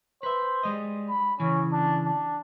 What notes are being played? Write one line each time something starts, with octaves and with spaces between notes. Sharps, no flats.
B4 C5 E5
G3 G#3 D#5
B5
C#3 E3 C#4
D4
D4